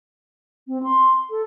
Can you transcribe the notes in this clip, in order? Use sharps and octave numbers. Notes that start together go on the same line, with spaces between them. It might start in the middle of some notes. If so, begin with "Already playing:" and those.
C4
C6
A4